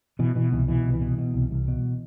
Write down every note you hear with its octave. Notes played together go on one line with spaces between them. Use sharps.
B2 E3
B2 E3
C2 E3
B2 E3
C2
E3
B2
B2
C2
C2
B2